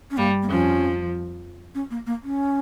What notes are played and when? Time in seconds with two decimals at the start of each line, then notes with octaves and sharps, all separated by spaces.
0.11 C#4
0.17 G2 G3 A#3
0.42 A#3
0.49 F2 F3 C#4
1.75 C#4
1.90 A#3
2.06 A#3
2.23 C#4